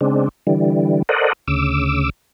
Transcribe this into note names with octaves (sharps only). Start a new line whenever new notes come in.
C#3 G#3 C4 D4
D3 E3 G3
A4 A#4 C5 D5 D#5 F#5
D2 C#3 D6 E6